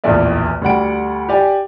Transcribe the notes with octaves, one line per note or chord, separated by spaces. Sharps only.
D1 A#1 E2 A2 D5 E5
D2 G3 F#5 D7
G4 D5 G#5